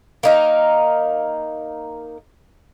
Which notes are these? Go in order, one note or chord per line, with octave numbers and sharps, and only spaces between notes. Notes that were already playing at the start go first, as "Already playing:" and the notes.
A#3 D#4 A#4